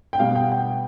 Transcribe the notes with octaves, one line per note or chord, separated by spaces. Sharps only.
G5
B2 G3 B3 F5
G5
G5